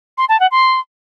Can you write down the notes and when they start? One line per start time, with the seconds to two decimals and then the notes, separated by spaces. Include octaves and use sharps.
0.18 C6
0.29 A5
0.40 F#5
0.51 C6